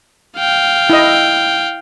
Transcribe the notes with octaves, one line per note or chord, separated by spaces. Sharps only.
F5 G5
E4 D#5